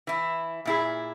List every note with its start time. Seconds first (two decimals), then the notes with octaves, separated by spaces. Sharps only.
0.07 E3 E4
0.65 A#2 E4 G#4